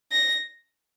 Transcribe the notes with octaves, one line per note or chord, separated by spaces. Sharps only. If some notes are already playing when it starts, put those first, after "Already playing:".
A#6